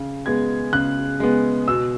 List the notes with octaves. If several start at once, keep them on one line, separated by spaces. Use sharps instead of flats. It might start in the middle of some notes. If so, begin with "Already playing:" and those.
Already playing: C#3
G#3 B3 G#6
C#3 F#6
G#3 B3
B2 E6